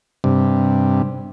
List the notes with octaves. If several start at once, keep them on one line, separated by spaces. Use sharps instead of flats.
G2 C3